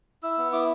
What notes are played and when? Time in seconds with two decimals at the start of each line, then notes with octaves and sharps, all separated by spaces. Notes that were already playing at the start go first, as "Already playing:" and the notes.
0.23 E4 E6
0.38 B3
0.53 E4 D6